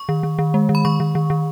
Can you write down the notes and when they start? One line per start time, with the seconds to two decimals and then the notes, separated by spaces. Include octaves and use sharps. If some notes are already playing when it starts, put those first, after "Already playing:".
Already playing: C#6
0.09 D#3
0.23 D#3
0.39 D#3
0.54 G#3
0.69 D#3
0.75 B5
0.85 D#3 C#6
1.00 D#3
1.15 D#3
1.30 D#3